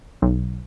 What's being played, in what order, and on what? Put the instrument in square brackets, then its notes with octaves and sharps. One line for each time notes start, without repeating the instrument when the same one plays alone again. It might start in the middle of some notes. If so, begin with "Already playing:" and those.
[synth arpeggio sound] B1